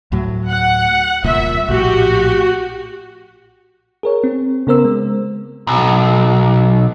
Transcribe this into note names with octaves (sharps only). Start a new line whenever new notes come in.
D2 A2 F#3
F#5
D#1 C2 A#2 E5
A#1 A2 F#4 G4
G#4 A#4 C#5
C4
C#3 B3 A#4 C5 E6
G#3
B1